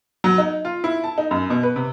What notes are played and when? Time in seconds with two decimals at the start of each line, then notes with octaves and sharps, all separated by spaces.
0.24 F#3
0.38 D#4
0.65 F4
0.84 E4
1.04 A5
1.18 D#4
1.31 F#2
1.50 B2
1.63 B4
1.76 C3